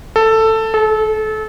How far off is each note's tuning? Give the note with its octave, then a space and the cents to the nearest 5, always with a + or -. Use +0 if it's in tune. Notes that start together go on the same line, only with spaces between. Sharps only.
A4 +10
A4 -30